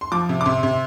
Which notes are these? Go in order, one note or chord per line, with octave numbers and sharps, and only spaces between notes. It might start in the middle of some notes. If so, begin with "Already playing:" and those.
C6
F3 D6
C3
D6
C3 C6
C3